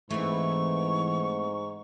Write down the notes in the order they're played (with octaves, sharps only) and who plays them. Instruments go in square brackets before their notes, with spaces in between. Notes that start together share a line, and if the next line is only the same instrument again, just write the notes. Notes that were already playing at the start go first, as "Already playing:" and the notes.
[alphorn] G#2 [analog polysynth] E3 [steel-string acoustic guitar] A3 C4 [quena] C#6